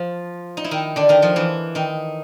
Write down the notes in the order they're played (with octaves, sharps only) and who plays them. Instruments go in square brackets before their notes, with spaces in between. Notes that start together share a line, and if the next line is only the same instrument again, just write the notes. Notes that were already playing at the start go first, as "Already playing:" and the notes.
Already playing: [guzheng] F3 F4
D#4
E4
D#3 D#4
D3 D4
D#3 D#4
F3 F4
E3 E4
D#3 D#4